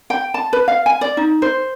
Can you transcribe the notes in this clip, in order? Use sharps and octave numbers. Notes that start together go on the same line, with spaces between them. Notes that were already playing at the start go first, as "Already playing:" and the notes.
G5
A5
B4
F5
G#5
D5
D#4
C5